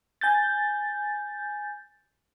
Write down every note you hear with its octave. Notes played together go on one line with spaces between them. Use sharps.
G#5 G6 A6